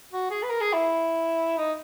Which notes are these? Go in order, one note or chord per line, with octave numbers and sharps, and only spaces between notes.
F#4
G#4
B4
A#4
G#4
E4
D#4